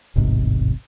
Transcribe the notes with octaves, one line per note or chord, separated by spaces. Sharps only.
E1 A1 G#2 C3